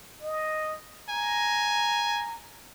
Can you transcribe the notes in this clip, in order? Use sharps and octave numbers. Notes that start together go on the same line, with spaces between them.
D#5
G#5 A#5